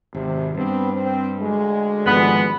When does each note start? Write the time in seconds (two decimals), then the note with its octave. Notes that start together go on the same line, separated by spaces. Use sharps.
0.14 G#1 C3
0.55 G2 B3 C4
0.93 C4
1.39 D2 G#3
2.06 G#1 G#2 F3 B3